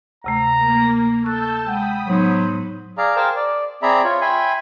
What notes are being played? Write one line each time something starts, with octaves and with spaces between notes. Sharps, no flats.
D2 C3 A3 A#5
A#3
A4 A5 C#6 E6 F#6 G6
G#3 F#5 G5 B5 D#6
A2 F#3 B3 D#4 C5
G#4 D5 F5 A#5
G#4 A#4 C5 F5 G5 A5
D5
C4 G#4 D5 E5 A#5 B5
F4 C#5
E5 G5 G#5 B5 C6